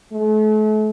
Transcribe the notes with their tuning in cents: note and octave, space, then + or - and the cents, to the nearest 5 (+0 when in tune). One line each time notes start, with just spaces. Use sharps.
A3 -40